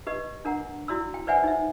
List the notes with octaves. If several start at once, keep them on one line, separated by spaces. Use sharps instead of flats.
G4 B4 D#5
D4 A#4 F#5 A#5
E4 F#4 D5 C6 E6
G5
B4 C5 D5 E5 F#5 G#5
D#4 E5